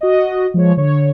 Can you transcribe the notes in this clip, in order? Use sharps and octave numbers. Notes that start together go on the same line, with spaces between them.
F#4 D#5
F3 G#3 C#5
D3 C#5